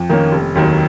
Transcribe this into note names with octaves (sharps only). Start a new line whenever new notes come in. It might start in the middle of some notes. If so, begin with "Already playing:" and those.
Already playing: F2
D#3 A#3 C#4
F1
D#2 D#3 F#3